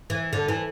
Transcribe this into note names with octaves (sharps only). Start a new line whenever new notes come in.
E3
D3
E3